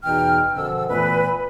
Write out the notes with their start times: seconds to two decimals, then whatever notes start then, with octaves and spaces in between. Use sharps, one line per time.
0.03 E2 B2 E3 D#4 G5 F6
0.54 F#2 B2 D3 F3 E6
0.89 A#2 E3 A3 B3 B4